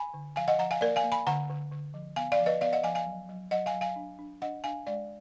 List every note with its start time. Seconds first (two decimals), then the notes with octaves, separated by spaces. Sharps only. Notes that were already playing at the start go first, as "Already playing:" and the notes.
Already playing: G#5 B5
0.14 D3
0.36 F3 F5 G#5
0.48 D#5 F#5
0.59 F3 F#5 A#5
0.71 F5 G#5
0.81 A#3 A#4 D5
0.96 F5 G#5
1.04 A#3
1.12 G#5 B5
1.27 D3 F#5 A#5
1.49 D3
1.71 D3
1.94 F3
2.16 B3 F5 G#5
2.32 D5 F5
2.40 F3
2.46 B4 D#5
2.61 B3 D5 F5
2.73 D#5 F#5
2.84 F3 F5 G#5
2.95 F5 G#5
3.06 F#3
3.29 F#3
3.51 F#3 D#5 F#5
3.66 F5 G#5
3.74 F#3
3.81 F5 G#5
3.96 D4
4.19 D4
4.42 D4 D#5 F#5
4.64 D4 F5 G#5
4.87 G#3 D5 F5